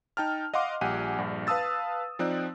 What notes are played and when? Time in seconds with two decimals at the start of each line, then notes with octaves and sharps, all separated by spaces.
0.17 D#4 G5 A5 F6
0.54 D#5 F5 F#5 C6 D6
0.81 A#1 G3 G4 F#5 G#5 D#7
1.18 A#1 G2
1.47 B4 F5 A5 D#6 E6 A6
2.19 F3 C4 D#4 D5 F#6